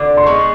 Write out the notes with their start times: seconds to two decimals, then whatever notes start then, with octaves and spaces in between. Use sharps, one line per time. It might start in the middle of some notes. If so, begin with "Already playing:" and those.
Already playing: D3 D6
0.17 C6
0.26 D#3 G#3 B3 C#6